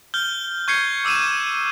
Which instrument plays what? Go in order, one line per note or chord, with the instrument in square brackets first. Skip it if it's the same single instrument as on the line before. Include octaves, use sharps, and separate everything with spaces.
[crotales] F6 G6 G7
C#6 G6 G#6 C7 C#7 G7
D6 E6 C#7 D#7 E7